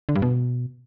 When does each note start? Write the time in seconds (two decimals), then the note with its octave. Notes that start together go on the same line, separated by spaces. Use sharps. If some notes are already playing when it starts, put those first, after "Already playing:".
0.09 D3
0.15 G2
0.22 B2